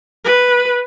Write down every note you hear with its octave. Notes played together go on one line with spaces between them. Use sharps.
B4